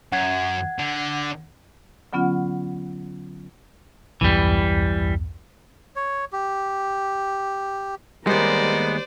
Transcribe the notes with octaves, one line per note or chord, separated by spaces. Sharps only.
F#2 F#5 G#6
D3
D3 F#3 B3 C#4 F4 F#5
B1 E2 G2 E3 G3
C#5
G4
D#2 G3 G#3 B3 A#4 C5 D5